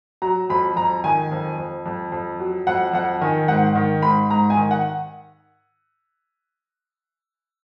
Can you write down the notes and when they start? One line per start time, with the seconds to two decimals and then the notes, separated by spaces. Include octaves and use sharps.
0.22 F#3 A#5
0.50 F2 B5
0.76 F2 A#5
1.04 D#3 G#5
1.32 F2
1.58 F2
1.86 F2
2.12 F2
2.40 F#3
2.67 F2 F#5
2.94 F2 F#5
3.21 D#3 G#5
3.48 G#2 F#5
3.75 D#3
4.02 G#2 B5
4.30 G#2 A#5
4.50 G#5
4.57 D#3
4.71 F#5